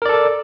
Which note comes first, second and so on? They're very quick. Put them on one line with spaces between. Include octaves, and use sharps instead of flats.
A#4 D5 A4